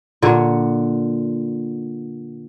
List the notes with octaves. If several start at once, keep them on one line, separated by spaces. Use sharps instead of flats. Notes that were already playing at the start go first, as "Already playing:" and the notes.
A#2 D3 C#5